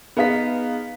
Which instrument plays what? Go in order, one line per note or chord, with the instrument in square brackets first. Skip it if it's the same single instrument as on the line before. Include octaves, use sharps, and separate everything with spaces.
[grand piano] B3 D#4 B6 [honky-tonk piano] G#4 B4 F5